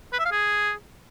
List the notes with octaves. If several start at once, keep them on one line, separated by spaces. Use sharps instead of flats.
B4
E5
F5
G#4